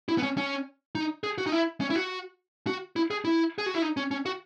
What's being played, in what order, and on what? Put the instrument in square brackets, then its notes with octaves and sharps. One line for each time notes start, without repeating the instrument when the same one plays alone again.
[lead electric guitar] E4
B3
C#4
C#4
D#4
G#4
F#4
D#4
E4
C#4
E4
F#4
F#4
E4
G#4
E4
G#4
F#4
E4
D#4
C#4
C#4
F#4